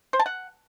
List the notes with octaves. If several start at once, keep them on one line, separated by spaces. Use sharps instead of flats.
C5
A5
F#5